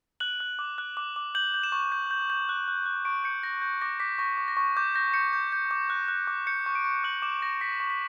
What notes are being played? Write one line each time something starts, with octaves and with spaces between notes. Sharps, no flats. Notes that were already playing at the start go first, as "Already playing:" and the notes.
F#6 F#7
F#6
D6
F#6
D6
D6
G6 F#7
G6
E7
C#6
G6
G6
G6
F#6
F#6
F#6
C#6 D7
G6 C#7
G6 A#6
G6
D6 A#6
D6 B6
C#6 A#6
C#6
A#6
C#6
D6 G6
G6 A#6
G6 C#7
G6
G6
D6
F#6
F#6
D6
G6 C#7
C#6
D7
C#6
F#6 F#7
D6 E7
D6 A#6
C#6 B6
C#6
B6